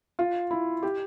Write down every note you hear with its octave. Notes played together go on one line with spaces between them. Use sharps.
F4
E4
G4